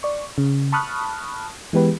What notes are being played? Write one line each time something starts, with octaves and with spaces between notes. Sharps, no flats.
D5 C#6
C#3
A5 B5 C#6 D#6 F6 F#6
E3 G#3 B3 G4 B4